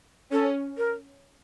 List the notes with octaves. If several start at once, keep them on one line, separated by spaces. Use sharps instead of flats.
C#4 A4
A#4